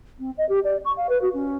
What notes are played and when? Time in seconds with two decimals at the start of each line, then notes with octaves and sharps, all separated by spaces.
0.19 C4
0.37 D#5
0.49 G4
0.64 D5
0.85 C#6
0.96 F5
1.09 B4
1.21 F#4
1.33 C#4